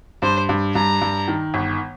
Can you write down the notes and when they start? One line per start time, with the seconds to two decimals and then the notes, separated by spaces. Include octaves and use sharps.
0.22 G2 C5
0.49 G2
0.75 G2 A#5
1.01 G2
1.28 D#3
1.54 G1